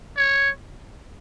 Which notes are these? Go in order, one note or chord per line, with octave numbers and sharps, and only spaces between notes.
C#5